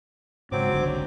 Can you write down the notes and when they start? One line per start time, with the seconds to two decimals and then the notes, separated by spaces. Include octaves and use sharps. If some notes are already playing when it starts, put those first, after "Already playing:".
0.52 G#2 C#3 F#3 G#3 C4 D6
0.74 G1 C2 D3